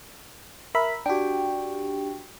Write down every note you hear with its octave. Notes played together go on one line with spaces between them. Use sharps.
A#4 E5 B5
D4 F#4 G4 G5